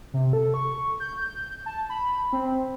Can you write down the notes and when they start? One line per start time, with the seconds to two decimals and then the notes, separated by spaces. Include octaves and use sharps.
0.14 C3
0.33 A4
0.54 C#6
1.00 G6
1.66 A5
1.90 B5
2.33 C4